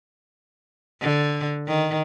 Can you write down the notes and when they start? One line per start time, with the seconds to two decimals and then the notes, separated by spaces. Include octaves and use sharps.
1.02 D3
1.68 D#3